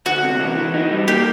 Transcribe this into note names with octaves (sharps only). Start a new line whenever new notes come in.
D2 F#4
C3
E3
E3
D#4
G3
A#3 G4